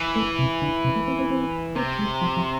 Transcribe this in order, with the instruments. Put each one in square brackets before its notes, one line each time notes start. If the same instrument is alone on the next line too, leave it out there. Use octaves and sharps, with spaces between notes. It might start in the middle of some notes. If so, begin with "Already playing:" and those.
Already playing: [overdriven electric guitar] E3
[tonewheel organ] A3
C3
D3
C3
A3
C4
C4
C4
[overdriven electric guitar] C3 [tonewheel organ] B3
[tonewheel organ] G#3
F3
F3